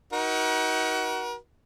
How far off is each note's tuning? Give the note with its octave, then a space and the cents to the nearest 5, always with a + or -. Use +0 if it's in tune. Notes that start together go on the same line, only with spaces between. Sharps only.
D#4 +35 F#4 +20 A#4 +40